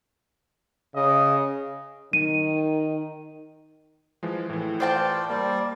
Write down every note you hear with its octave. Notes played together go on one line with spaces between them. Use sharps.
C#3 D#5
D#3 D#7
E3 F3 G#3
A2 E3
F4 C5 D5 G5 A5
G3 A#3 D5